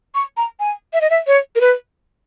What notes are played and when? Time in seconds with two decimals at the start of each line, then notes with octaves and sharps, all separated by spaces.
0.15 C#6
0.37 A#5
0.60 G#5
0.93 E5
1.01 D#5
1.10 E5
1.27 C#5
1.56 A#4
1.61 B4